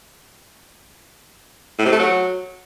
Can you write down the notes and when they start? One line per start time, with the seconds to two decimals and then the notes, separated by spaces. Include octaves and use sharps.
1.79 A2
1.85 C3
1.92 A3
1.99 F#3